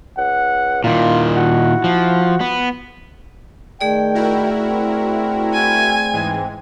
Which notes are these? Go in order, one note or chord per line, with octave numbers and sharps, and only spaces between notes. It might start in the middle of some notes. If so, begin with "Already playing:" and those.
C#2 F#5
A#2 D#3 E4 F4
F#4
F3
B3
D#3 A3 G#4 D5 G5
E4 F#4 A#4
C4
G#5
G#2 E3 G#3